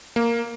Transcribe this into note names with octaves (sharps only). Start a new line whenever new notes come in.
A#3